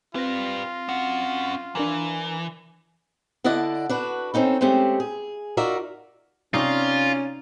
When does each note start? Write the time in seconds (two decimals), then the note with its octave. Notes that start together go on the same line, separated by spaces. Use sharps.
0.15 C4 F4 G4 B4 A#6
0.89 C#4 F#5
1.75 E3 D4 A#4 A#5
3.44 D3 E4 D5 D#5 F#5 A5
3.89 D4 F#4 B4
4.34 C4 C#4 D#4 A4
4.61 G#3 A3 C4 C#4 G4 G#4
5.00 G#4
5.57 D#4 F4 F#4 A#4 D5 E5
6.54 C3 C#4 D#4 F4 D5